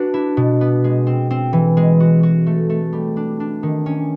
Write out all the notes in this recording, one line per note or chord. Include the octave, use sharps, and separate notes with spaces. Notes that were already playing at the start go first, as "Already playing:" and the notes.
Already playing: D4 F#4 B4
E4
B2
B3
G#3
C4
C4
E3
G#3
F#4
F#4
A3
A3
G3
D4
D4
D#3
C#4